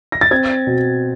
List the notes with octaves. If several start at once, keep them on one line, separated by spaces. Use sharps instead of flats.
A#6
A6
C4 G#6
B2